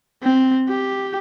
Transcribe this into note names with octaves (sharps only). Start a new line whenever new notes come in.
C4
G4